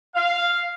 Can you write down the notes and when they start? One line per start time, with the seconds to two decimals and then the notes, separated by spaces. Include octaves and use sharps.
0.15 F5